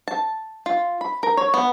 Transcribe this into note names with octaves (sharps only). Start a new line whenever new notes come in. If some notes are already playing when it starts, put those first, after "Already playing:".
A5
F4
B5
A#4
C#5
B3